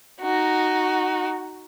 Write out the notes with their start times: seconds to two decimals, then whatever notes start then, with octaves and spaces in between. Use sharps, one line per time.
0.21 D#4 F#4